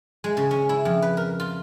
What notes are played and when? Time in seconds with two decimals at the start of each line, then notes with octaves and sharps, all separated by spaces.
0.24 G#3
0.37 C#3
0.51 C#4
0.69 E4
0.85 F2
1.02 B4
1.17 A#4
1.40 F4